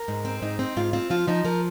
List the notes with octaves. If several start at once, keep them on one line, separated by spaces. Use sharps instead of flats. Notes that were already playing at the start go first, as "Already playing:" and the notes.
Already playing: A#4
G#2
C4
G#2 D#4
C4
G#2 F4
C4 F4
F3 F4
F3 D#4
F3 A#4